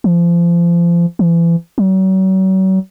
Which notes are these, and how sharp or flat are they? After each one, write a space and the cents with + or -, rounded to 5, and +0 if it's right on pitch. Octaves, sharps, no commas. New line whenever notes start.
F3 -30
E3 +35
F#3 +40